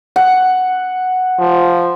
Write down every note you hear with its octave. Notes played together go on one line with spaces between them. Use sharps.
F#5
F3